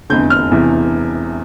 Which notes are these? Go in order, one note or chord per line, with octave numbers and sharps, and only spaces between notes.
F1 E2 D3 G6
F6
E1 E2 C3 E3